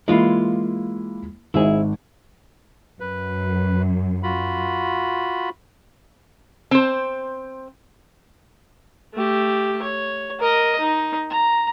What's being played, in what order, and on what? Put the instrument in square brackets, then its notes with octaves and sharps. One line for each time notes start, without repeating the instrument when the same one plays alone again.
[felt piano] E3 A#3 E4 [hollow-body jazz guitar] G#3 F4
[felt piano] G#1 G#2 [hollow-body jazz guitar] E4 G#4
[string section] F#2 [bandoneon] B4
[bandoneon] F4 F#4 B5
[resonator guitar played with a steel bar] C4 C5
[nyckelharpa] A3 G4
C#5
A#4 D#5
D#4
A#5